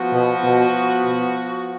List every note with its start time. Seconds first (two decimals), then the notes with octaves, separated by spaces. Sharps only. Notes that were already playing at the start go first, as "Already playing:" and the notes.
Already playing: F3 B3 F#4
0.12 B2
0.43 B2
1.03 B2